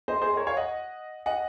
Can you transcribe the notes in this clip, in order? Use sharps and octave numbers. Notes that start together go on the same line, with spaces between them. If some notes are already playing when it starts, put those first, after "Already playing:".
C5 D#5
G#4 C5
D#5
A#4 C#5
C#5 F5
D#5 F#5
D#5 F#5